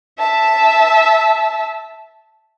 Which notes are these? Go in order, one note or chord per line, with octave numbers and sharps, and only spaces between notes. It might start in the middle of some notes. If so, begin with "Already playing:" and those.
E5 A5